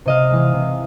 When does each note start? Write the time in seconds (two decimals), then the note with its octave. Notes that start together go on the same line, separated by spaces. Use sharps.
0.06 C3 D#5 F5
0.31 E3 G#3
0.53 C3